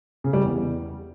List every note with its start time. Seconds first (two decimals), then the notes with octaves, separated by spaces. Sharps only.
0.24 C#3
0.33 G3
0.42 E2